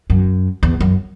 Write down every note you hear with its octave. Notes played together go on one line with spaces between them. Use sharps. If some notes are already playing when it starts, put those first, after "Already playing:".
F#2
E2
F#2